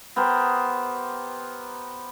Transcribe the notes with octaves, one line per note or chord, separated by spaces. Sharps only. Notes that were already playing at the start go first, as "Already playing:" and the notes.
B3 G4 A#4 C5